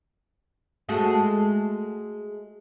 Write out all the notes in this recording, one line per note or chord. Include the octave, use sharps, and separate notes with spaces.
G#3 A3 F#4